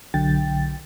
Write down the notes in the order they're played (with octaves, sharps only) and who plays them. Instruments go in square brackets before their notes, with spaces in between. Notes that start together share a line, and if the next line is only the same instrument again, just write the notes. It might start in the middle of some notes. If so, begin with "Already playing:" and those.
[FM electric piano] B1 D3 F#3 G5 A6